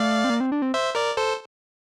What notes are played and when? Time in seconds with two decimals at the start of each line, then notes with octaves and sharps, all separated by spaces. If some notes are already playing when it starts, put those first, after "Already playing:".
Already playing: A3 D5 F5
0.24 C4
0.30 A#3
0.40 C4
0.52 D4
0.62 C4
0.74 C5 E5
0.95 A#4 D5
1.17 A4 C5